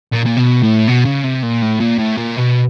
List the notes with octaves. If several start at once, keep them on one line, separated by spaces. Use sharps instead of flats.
A#2
A#2
B2
A2
B2
C#3
C3
A#2
A2
A#2
A2
A#2
B2